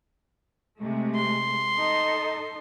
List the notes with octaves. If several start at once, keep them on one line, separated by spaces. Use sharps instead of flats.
C3 G#3 A3
C6
D#4 A4